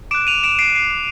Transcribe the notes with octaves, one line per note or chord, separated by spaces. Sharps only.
D6 F#6 D7 E7
D#7 F7
D7 E7
C7 D7
C7